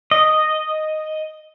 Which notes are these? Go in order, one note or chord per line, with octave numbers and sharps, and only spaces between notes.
D#5